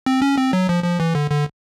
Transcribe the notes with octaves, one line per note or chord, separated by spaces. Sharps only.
C4
C#4
C4
F#3
F3
F3
E3
D3
D3